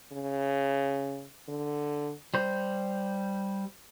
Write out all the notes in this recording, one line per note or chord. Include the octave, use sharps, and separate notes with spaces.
C#3
D3
G3 C5